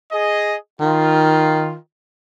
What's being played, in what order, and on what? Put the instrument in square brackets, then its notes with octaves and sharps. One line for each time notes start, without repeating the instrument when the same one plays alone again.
[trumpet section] G#4 D#5
[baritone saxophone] D#3 [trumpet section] F4